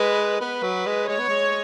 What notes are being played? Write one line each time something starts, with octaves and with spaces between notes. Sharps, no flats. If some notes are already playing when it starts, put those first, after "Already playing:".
Already playing: G#3 B4
B3 B4
F#3
G#3
G#3 C#5
B3
G#3